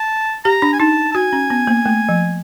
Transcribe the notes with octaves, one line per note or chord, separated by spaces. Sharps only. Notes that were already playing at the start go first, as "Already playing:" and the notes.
Already playing: A5
G4 A#5
D4
G#5
D#4 A5
A5
F#4 G#5
C#4
B3
A#3
A3
F3